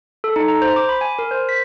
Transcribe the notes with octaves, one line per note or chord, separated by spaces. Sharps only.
A4
D#4
A#5
C5
D6
B5
G#5
A#4
C5
B6